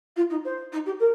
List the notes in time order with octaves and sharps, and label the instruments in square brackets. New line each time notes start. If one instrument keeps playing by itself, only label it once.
[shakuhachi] F4
D#4
C5
D#4
G4
A#4